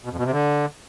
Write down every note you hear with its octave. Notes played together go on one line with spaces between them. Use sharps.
B2
F2
B2
C3
D3